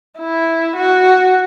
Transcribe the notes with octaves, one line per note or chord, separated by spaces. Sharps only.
E4
F#4